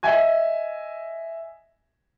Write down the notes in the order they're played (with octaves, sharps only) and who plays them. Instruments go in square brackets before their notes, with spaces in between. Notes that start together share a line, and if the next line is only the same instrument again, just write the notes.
[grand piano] D#5 E5 G#5 G#6